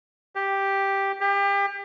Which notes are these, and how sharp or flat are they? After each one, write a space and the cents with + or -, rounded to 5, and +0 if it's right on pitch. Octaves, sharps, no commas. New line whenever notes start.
G4 +0
G4 +30